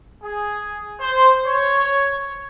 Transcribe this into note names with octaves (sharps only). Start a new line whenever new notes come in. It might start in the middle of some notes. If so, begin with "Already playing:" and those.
G#4
C5
C#5